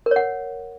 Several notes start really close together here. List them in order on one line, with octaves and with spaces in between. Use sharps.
A#4 C#5 F#5